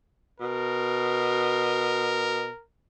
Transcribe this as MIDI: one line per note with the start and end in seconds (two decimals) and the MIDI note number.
0.40 2.49 47
0.40 2.63 70